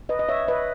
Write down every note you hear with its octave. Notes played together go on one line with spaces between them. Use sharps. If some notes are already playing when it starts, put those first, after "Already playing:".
B4 D#5
D#5
C#5 E5
B4 D#5